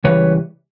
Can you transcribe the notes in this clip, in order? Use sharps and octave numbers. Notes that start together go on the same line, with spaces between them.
C#2 C#3 E3 G3 B4 C#5